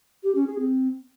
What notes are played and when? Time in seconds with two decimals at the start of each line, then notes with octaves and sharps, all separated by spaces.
0.23 G4
0.35 C#4
0.47 G#4
0.59 C4